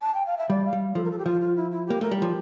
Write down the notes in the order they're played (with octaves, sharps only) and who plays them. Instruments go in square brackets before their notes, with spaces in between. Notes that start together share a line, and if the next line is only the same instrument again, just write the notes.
[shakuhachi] A5
G5
F5
E5
[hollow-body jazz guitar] G3 [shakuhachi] D5
[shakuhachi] F5
[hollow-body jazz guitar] G3
[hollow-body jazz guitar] F3 [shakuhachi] A4
[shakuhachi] A#4
A4
G4
[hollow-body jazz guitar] F3 [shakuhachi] F4
[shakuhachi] F4
E4
E4
[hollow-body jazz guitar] A#3 [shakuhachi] G4
[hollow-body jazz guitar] A3 [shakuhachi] A#4
[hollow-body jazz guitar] G3
[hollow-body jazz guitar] F3 [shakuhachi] G4